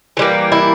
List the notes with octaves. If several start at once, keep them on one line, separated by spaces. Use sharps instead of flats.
E3 G3 A#3
E4